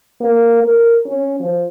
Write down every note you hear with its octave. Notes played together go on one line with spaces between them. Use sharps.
A#3
A#4
C#4
F3